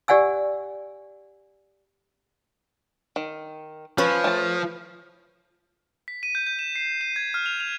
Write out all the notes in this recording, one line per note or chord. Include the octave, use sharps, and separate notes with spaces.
G4 D5 F#5 G#5 E6
D#3
F3 C#4 B4 C#5
A3 A5
B6
D#7
G6
G6
E7
C7
D#7
G#6
F6
F7
F7